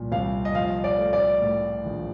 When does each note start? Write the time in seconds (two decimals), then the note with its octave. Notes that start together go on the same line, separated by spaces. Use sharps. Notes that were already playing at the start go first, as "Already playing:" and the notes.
Already playing: C2 A#2 F3
0.12 C2 F5
0.45 D#5
0.55 F3 F5
0.84 D5
0.98 A3
1.13 D5
1.42 A2
1.85 A#1